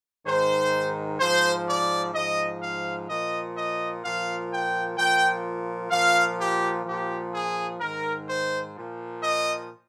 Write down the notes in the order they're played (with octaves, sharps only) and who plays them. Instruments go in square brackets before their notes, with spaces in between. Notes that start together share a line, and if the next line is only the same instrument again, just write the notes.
[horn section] G#2 D#3 C5
G#2 F3 C5
D5
G#2 F3 D#5
F5
A#2 F3 D#5
D#5
A#2 F3 F5
G5
A#2 F3 G5
A#2 F3 F5
G4
A#2 F3 G4
G#4
G#2 D#3 A#4
C5
A#2 F3
D#5